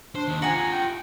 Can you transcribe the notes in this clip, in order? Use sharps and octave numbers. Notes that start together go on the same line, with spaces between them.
D4 C5
D#2 D#3
F4 G4 F#5 G#5 A#5
G5